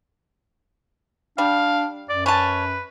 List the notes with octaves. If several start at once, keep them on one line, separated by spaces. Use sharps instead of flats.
G3 D4 F5
F#2 D5
C#4 B4 A5